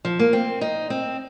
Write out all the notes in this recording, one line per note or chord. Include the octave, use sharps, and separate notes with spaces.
F3
A#3
C4
D#4
C4